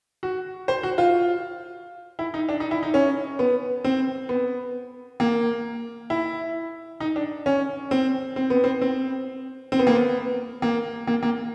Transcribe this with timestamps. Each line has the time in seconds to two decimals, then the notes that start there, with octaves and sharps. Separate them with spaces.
0.23 F#4
0.68 C5
0.83 F#4
0.98 F4
2.19 E4
2.34 D#4
2.49 D4
2.60 D#4
2.71 E4
2.83 D#4
2.94 C#4
3.39 B3
3.84 C4
4.29 B3
5.20 A#3
6.10 E4
7.00 D#4
7.16 D4
7.46 C#4
7.91 C4
8.36 C4
8.50 B3
8.64 C4
8.81 C4
9.72 C4
9.79 B3
9.87 A#3
9.95 B3
10.62 A#3
11.07 A#3
11.23 A#3